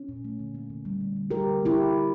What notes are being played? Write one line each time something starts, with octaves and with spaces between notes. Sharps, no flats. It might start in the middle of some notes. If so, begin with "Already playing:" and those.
Already playing: C#4
A#2
A3
D3
A#3
D3
G3
D3
D3
G3 G4 A#4
D3
A#3 E4 G4
D3
D3